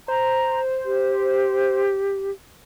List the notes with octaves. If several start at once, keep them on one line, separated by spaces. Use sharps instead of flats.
C5 A#5
G4